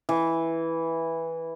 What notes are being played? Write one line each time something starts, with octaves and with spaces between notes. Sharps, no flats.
E3